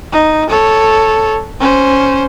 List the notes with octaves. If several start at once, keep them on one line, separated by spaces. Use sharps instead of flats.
D#4
A4 C#5
C#4 C5